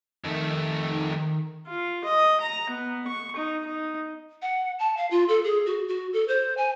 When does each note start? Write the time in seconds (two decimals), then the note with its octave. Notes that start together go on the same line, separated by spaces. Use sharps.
0.24 F2 D#3 A3
1.67 F4
2.05 D#5
2.41 A#5
2.70 B3
3.07 C#6
3.36 D#4
3.65 D#4
4.42 F#5
4.79 A5
4.97 F5
5.11 F4
5.29 A4
5.44 G#4
5.66 F#4
5.88 F#4
6.13 A4
6.28 C5
6.57 G#5